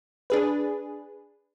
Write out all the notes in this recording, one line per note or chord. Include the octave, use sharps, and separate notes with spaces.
D4 G#4 B4